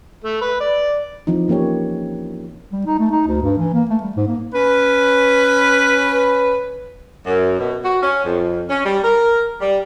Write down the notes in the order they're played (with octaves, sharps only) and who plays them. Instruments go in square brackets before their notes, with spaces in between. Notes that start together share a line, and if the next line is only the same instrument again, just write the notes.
[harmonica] A3
B4
D5
[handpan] E3 F3 C4 D#4
E3 A#3 C#4 G4 C#5
[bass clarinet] G3
D#4
A3
D#4
D2
G2
E3
A#3
A3
G3
G#2
A#3
[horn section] C#4 B4
[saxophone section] F#2
B2
F#4
C#4
F2
C#4
G3
A#4
G3